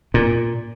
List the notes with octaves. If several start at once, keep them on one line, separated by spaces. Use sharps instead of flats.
A#2